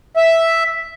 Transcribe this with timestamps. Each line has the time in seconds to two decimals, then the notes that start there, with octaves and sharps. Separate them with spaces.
0.17 E5